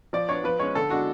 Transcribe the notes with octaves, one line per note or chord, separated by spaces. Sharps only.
F3 D5
B3 D4 C#5
F3 B4
G#3 C#4 C#5
D3 A4
G#3 D4 F#4